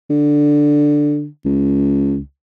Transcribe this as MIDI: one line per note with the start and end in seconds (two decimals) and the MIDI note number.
0.10 1.27 50
1.45 2.19 37